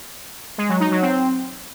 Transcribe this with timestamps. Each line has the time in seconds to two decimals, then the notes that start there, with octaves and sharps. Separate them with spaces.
0.58 G#3
0.69 F#3
0.80 D#4
0.91 F#3
1.02 C4